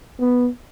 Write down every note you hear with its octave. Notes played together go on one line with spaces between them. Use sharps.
B3